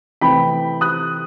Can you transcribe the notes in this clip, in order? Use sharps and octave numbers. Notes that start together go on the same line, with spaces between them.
C3 E3 A3 C4 G5 B5
D#6 F#6